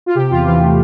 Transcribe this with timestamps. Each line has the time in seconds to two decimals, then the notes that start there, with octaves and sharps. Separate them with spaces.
0.06 F4
0.15 C3 G4
0.30 E2 F4
0.45 E3 F4
0.61 A3